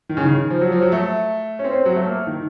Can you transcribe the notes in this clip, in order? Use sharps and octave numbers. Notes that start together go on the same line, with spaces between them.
D#3
C#3
D#3
F3
F#3
F3
F#3
A3
C#4
C4
C4
F#3
A3
A#3
D#3